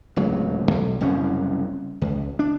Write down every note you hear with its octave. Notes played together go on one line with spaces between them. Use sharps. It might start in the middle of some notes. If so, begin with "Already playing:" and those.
D1 C#2 F#3
B1
F#1 C2 F#2 C#4
C#2
D4